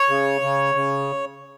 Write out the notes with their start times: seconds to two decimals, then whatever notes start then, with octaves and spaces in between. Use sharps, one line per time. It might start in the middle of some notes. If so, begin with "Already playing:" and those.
Already playing: C#5
0.09 C#3
0.41 C#3
0.75 C#3